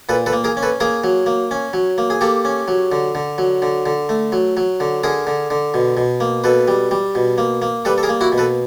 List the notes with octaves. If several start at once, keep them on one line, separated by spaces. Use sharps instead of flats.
A#2 A4 B4
A4 B4
A#3
G#4 A#4
C#4
A4 B4
A#3 G#4 A#4
F#3
A#3
C#4
F#3
A#3
G#4
A#3 G4 A4
C#4
F#3
D3
D3
F#3
D3
D3
A3
F#3
F#3
D3
D3 G#4 A#4
D3
D3
B2
B2
A#3
B2 A4 B4
G3
G3
B2
A#3
A#3
G3 A4 B4
A4
G#4 A#4
A#3
E4 F#4
B2
A4 B4